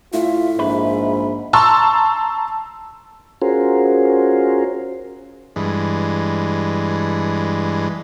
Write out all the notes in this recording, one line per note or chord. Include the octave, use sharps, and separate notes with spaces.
A2 F4 E5
A#1 G#2 B4
A5 A#5 C6 C#6 E6
C#4 F4 F#4 G#4 A#4 C5
G2 E3 G#3